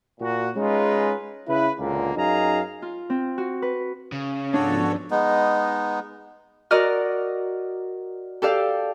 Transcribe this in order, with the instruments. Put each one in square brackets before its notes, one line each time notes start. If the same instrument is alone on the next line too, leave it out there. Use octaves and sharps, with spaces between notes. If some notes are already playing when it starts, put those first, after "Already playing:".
[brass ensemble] A#2 F#4
G#3 C#4 D#4 F4 B4
C#3 E4 B4
C#2 A#2 D3 A#3
F#2 D#4 G#4 F5 A#5
[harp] F4
C4
F#4
B4
[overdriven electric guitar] C#3 [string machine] C#4
[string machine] G#2 F3 B3 [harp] D4 [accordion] F#4 A4 C#5
[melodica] G#3 B3 D#4
[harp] F#4 A#4 D5 D#5 F6
G4 A4 D5 F5